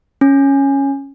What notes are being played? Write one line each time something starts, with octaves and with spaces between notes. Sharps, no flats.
C#4